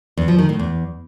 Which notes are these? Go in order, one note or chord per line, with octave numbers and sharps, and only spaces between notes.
E2
F3
D#3
A2
E2